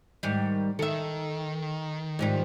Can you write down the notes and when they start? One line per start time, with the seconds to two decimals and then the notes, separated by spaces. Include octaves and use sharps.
0.23 G#2 D#3 G3
0.79 D#3 A4 E5
2.19 G#2 F3 G3